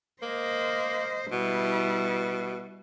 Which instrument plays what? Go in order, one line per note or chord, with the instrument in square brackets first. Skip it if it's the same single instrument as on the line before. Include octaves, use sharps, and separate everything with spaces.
[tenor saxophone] A#3 [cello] C5 D#5
[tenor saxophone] B2 [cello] G3 E4